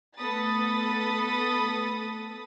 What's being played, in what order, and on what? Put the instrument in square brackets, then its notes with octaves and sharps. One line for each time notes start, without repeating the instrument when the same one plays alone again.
[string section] A3 B3 A4 B5 D#6 A6